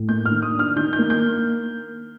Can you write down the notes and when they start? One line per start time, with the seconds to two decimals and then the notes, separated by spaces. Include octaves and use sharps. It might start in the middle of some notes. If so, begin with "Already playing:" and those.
Already playing: A2
0.09 A#3 G6
0.26 F6
0.31 D#3
0.42 D#6
0.54 D4
0.59 F6
0.76 D#3 G6
0.93 G6
0.99 A#3
1.10 G6